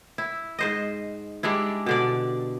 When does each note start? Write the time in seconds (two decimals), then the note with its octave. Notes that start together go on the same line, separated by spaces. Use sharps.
0.18 E4
0.59 G#2 C5 D#5
1.43 G3 G#3 D4 E4
1.86 B2 D3 D5